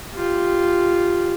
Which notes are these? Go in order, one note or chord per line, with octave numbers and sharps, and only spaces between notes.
F4 G4